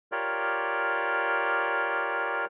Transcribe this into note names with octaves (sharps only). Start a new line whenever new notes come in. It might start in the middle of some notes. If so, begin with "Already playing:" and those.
F4 G4 A#4 C#5 D5